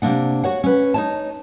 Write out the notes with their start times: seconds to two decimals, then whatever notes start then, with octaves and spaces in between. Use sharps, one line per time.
0.02 C3 F3 A#3 D4 F#5
0.44 F#4 C#5 F#5
0.64 C#4 B4
0.94 D#4 C#5 A5